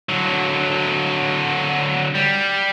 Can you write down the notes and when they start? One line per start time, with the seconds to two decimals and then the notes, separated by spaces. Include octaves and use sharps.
0.09 D3 F#3
2.15 G3